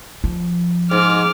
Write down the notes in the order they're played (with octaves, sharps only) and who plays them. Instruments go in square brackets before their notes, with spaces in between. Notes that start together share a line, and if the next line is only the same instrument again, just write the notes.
[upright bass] F3
[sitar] G#2 [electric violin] D6 F6